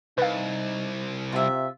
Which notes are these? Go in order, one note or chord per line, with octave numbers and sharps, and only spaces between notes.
C2 D#4 B4 F5
C3 F4 E5